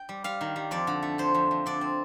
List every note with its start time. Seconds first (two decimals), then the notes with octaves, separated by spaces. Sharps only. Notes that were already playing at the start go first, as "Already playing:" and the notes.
Already playing: G5
0.09 G3
0.24 G3 F5
0.41 D#3
0.56 G3
0.71 F2 D5
0.87 D3
1.03 A3
1.18 F2 C5
1.34 F2
1.51 F2
1.66 D3 D5
1.81 C4